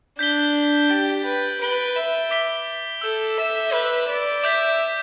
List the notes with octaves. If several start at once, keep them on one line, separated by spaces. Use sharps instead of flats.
D4 G6 B6 G7
G4 A6 D7 G7
B4
B4 G6 D7 G7
E5
D6 B6 G7
A4 E6 G6 E7
E5
B4 G6 E7 G7
D5
E5 D6 G6 B6